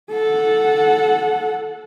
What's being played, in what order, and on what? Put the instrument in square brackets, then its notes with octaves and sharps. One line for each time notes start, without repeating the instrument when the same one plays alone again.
[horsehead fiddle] A4 F#5